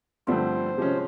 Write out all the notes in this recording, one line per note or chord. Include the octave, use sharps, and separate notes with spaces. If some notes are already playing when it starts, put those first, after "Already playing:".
G2 D3 F3 A3 C4 C5
C3 F3 G#3 C#4